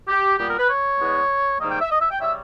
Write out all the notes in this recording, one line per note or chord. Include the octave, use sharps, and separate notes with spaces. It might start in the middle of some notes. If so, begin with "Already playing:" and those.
G4
A#2 G3 B3 G4
A#4
B4
C#5
E2 B2 G#3 B3
G#2 D#3 G3 A#3 D#5
G5
E5
D#5
E5
G5
C#3 G3 E5